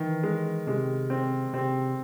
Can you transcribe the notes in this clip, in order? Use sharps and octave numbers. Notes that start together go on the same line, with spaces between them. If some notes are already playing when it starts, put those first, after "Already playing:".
Already playing: D#3 E3
G#3
C3 G#3
C4
C3 C4